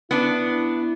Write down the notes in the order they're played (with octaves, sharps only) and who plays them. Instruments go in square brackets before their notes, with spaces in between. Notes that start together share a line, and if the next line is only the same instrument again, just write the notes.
[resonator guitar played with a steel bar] B3 D4 [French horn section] E4